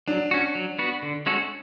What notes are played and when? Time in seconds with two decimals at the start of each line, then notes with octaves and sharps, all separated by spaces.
0.08 F#3 D4
0.31 C#4 F#4
0.55 F#3
0.79 B3 F#4 B4
1.02 D3
1.26 G#3 C#4 F#4 A4